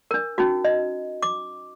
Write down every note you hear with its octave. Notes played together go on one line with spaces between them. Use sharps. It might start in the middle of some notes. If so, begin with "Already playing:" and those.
D4 A#4
C#4 D#4 F#4
D#5
D6